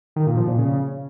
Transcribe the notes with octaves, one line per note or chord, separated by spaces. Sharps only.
D#3
A#2
F3
A#2
C#3